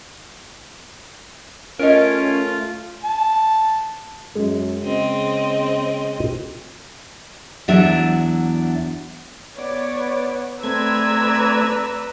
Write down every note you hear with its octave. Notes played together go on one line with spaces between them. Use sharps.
A3 C#4 F4 A#4 C#5 D#5
A5
F#2 G#3
C#3 C4 D#5
E2 F#3 D4 E5
B3 C#5 D5
A3 C4 B4 D5 A#5 E6 G#6